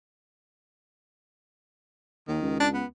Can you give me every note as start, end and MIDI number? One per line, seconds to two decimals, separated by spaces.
2.28 2.42 39
2.28 2.57 51
2.42 2.82 37
2.60 2.68 62
2.74 2.86 59